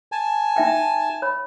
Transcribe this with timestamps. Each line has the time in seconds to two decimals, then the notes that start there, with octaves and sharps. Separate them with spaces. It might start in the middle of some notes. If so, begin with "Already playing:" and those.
0.12 G#5 A5
0.56 D#4 E5 G5
1.22 C#5 B5